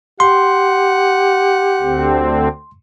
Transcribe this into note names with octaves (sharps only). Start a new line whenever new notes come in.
G4 F#5 C6
D2 D3 C4